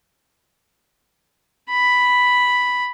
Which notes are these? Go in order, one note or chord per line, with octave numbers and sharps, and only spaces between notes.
B5